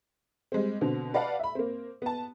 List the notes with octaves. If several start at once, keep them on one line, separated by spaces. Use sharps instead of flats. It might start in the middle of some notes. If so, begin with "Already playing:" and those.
G3 G#3 C4
B2 D3 C4
B4 D5 D#5 F5 F#5 A5
E5 B5
A#3 C4
B3 A5